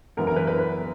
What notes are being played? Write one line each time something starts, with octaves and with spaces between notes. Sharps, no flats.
F#2 E3 B3 A#4
A#4
B4
B4